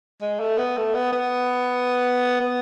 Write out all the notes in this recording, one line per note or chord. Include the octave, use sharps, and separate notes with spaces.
G#3
A3
B3
A3
B3
B3
B3